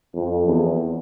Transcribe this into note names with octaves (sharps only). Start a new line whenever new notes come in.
F2
E2